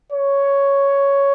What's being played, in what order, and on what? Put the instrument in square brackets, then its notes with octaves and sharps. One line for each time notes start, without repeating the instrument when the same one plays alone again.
[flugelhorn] C#5